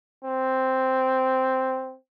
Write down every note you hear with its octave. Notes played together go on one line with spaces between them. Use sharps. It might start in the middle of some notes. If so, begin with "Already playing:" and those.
C4